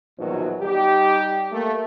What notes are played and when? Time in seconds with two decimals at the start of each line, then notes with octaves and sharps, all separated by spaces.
0.18 A#1 E2 B2 D#3 F#3
0.61 G3 D#4 G4
1.52 A3 A#3